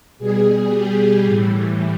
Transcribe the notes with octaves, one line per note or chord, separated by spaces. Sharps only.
B2 G3 G#4
G4
A2 E3 G3